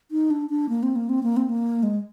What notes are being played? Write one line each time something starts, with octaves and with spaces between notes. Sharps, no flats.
D#4
D4
D4
A#3
C4
A#3
C4
A#3
C4
A#3
G#3